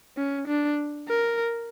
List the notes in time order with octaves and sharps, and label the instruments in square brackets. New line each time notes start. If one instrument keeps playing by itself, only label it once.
[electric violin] C#4
D4
A#4